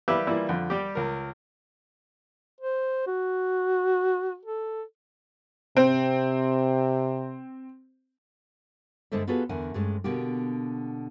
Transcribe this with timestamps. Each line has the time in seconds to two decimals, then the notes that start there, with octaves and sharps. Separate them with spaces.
0.08 G3 E4 G4 B4 E5 F5
0.27 E3 G3 A#3 E4 F4
0.49 F2 D3
0.70 G3 G4
0.95 C#2 A#4
2.61 C5
3.07 F#4
4.45 A4
5.77 C3 C4
9.12 G2 D3 G#3 A4 C5 E5
9.27 B3 F4 F#4 G#4 A4 B4
9.49 E2 D3 A3 A#4 F#5 G#5
9.74 G2 G#3 A3 C#4
10.04 B2 D3 A#3 G4